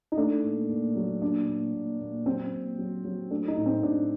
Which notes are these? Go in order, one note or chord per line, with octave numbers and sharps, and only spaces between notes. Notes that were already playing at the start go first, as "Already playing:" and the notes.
D#4
A3 D4
A#2
A#2
F#3
A#2 D4
A#2
A#2
A#2
F#3 C4
A#2
F#3
F#3
A3 D4
D#4
A2
C4
A2 D4